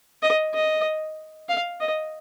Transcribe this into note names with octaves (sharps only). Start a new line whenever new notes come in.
D#5
D#5
F5
D#5